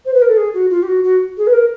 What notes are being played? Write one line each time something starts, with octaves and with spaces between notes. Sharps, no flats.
C5
B4
A#4
A4
G#4
F#4
F4
G4
F#4
F#4
G#4
B4
A#4